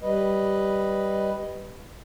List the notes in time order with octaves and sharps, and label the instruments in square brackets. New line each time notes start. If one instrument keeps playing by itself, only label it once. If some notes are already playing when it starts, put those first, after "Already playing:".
[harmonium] G3 B4 D#5